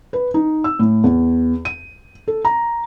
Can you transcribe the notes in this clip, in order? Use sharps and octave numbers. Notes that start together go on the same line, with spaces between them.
B4
D#4
E6
A2
E2
D#7
A4
A#5